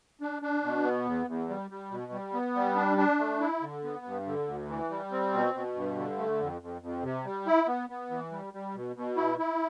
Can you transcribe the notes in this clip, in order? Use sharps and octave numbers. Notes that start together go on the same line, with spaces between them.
D4
D4
B2
B3
E2
E2
G3
G3
B2
G3
B3
G3
D4
D4
A3
E4
D3
B3
G2
D3
D2
E3
G3
C4
B2
B2
G2
D3
A3
F2
F2
F2
C3
G3
E4
B3
B3
E3
G3
G3
B2
B2
E4
E4